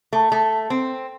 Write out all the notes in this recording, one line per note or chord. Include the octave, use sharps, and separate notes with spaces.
A3
A3
C4